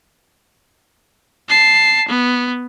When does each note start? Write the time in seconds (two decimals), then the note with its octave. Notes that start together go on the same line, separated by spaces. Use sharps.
1.49 A5 C7
2.08 B3